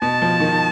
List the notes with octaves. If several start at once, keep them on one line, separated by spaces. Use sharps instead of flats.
B2 A5
F3
D#3